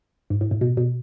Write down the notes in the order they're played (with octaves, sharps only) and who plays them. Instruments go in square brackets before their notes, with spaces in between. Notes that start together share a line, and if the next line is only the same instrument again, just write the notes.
[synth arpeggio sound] G#2
A2
A2
B2
B2